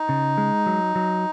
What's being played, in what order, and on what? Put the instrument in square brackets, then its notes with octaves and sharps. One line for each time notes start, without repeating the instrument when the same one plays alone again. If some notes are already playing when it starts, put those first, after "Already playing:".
Already playing: [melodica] D#4
[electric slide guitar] C#3
G#3
F#3
F#3